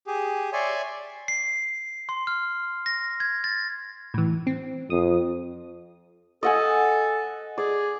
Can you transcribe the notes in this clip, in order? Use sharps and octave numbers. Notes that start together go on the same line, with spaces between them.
G4 G#4
C#5 D5 E5 G#5 C6
C7
C6
F6
A#6
G#6
A6
A2 E3
C4
F2 D#6
A4 D#5 F#5 G#5
G#4 D5